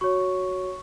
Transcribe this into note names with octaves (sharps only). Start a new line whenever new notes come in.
F#4 C#5 C#6